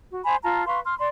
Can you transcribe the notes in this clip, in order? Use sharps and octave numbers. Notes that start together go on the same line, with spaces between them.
F#4
C5 G#5 B5
F4 A5 A#5
B4 F5 C6 C#6
C6 F6
D5 B5 C6